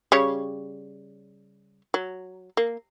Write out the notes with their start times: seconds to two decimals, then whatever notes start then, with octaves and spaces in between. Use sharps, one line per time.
0.12 C#3 G3 C#5
1.94 F#3
2.57 A#3